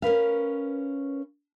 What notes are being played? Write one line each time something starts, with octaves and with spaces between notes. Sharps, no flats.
C#4 A#4 B4 F5